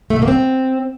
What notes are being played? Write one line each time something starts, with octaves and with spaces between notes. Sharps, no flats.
A3
B2
A#3
C4